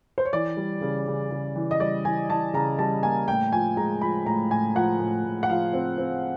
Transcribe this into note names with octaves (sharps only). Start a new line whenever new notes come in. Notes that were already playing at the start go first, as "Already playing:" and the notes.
C5
C#5
E3 D5
G3
C#3
C#3
C#3
E3
D#5
G3 D5
E3 G#5
E3 A5
C#3 A#5
G3 A5
A#3 G#5
A2 G5
F3 G#5
G#3 A#5
F3 B5
A2 A#5
A2 G#5
F3 F#5
A2
A2
F#5
F3 F5
C4
C4